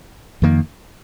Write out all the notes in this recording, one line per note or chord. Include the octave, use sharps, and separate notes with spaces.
F2 D#3 A#3